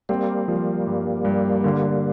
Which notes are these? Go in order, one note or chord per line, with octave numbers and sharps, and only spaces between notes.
G3 A#3 C4
F3
G2
G2
D3